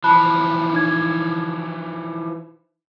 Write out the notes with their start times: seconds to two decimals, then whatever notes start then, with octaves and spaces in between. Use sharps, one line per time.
0.04 E3 F3 A5 B5 F#6
0.73 D#4 G#6